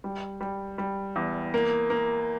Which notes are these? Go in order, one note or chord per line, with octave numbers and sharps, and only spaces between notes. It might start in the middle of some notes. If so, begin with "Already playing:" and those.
G3
G3
G3
E2
A#3
A#3